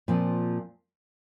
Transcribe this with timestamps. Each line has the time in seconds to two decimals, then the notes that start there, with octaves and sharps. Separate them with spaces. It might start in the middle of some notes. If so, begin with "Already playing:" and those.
0.08 A#2 F3 C4